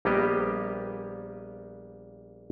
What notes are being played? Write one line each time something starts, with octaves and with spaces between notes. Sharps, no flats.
A#1 G3 A#3 B3 G4 D#5